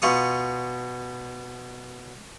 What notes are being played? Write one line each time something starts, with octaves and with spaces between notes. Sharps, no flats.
B2 F4 C#6 D#6